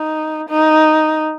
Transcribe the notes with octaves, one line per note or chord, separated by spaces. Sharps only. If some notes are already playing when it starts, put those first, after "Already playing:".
Already playing: D#4
D#4